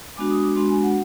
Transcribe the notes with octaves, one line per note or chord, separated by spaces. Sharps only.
G#3 B3 D4 F#4 D6
D#6
D6
G#3 B3 D4 F#4 C6
G#5
F#5